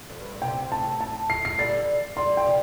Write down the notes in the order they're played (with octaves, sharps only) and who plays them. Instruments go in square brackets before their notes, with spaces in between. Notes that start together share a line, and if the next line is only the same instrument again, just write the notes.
[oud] F2
G2
A2
[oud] C3 [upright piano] G5
[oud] A2 [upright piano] A5
[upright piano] A5
C7
C7
[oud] D3 G3 [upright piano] A6
[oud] D3 G3 [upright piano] C6
[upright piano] G5
[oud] C3 F3